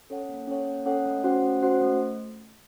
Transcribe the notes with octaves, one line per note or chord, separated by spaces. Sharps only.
C#4 A4 C#5 F#5
A#3
C#4 A4 C#5 F#5
A#3
C#4 A4 C#5 F#5
A3
C#4 F#4 C5 F#5
A3
C#4 F#4 C5 F#5
A3